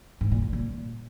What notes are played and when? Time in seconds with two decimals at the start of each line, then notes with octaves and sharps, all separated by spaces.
0.21 G#2
0.32 A#2
0.42 G#2
0.53 A#2